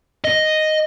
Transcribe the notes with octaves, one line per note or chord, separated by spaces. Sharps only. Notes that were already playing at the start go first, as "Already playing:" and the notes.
D#5